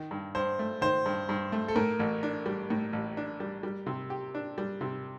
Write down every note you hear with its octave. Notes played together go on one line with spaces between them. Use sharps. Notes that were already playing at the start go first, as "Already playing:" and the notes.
Already playing: D#3
G2
G2 C5
A3
D#3 C5
G2
G2
A3
A4
A2 A#4
A1
D4
G3
A2
A1
D4
G3
G3
C3
G4
D4
G3
C3